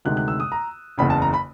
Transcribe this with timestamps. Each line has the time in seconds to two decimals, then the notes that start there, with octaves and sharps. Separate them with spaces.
0.05 D2 C3 D#3 G#3 F#6
0.17 F#6
0.28 E6
0.40 D#6
0.52 A#5
0.98 F#1 E2 C#3 B5
1.10 A5
1.22 A#5
1.34 B5